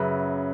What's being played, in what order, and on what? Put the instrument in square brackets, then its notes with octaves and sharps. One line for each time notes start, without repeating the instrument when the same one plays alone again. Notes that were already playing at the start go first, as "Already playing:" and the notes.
Already playing: [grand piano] F#2 C#3 F#3 B4 E5